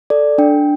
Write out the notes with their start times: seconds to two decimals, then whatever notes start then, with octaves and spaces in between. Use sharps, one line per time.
0.10 A4 D5
0.38 D4 G5